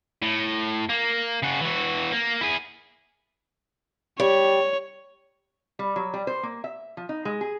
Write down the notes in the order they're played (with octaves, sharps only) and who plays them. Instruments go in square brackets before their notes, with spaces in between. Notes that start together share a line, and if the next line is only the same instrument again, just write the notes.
[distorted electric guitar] A2
A#3
C#3 F#4
E3 F#4
A#3
E4 G#4
[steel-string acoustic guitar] G3 [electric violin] C#5
[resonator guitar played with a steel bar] G3
F#3
G3
C5
A#3
E5
F3
D#4
G#3
G#4